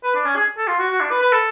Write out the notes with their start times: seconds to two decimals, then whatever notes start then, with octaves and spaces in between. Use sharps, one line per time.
0.04 B4
0.15 D4
0.25 C#4
0.35 G#4
0.57 A4
0.67 F4
0.79 F#4
0.90 F#4
1.01 D4
1.10 B4
1.22 B4
1.32 A4